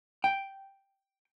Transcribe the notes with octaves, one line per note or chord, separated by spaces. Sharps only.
G5